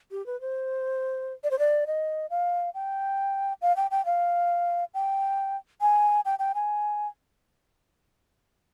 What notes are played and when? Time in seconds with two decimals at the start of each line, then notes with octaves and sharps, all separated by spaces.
0.11 G4
0.26 B4
0.41 C5
1.44 D5
1.51 C5
1.59 D5
1.87 D#5
2.30 F5
2.74 G5
3.62 F5
3.76 G5
3.91 G5
4.05 F5
4.94 G5
5.81 G#5
6.25 G5
6.39 G5
6.55 G#5